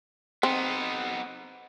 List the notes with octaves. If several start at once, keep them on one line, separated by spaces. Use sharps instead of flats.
B3 C4 D#4